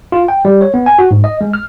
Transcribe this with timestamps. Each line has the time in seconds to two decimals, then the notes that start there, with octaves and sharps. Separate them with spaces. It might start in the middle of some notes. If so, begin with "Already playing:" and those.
0.12 F4
0.28 G5
0.45 G3
0.61 C#5
0.74 B3
0.86 G#5
0.99 F#4
1.11 G#2
1.24 D#5
1.41 G#3
1.53 F6